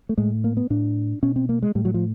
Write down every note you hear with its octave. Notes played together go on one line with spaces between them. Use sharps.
A3
A2 G#3
A#3
B3
A2 D4
B2 C#4
C4
A#3
G#3
A2 G3
F#3
F3